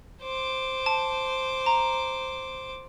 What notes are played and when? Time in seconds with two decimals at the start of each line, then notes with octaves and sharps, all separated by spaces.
0.23 C5 D6
0.86 A5
1.66 A#5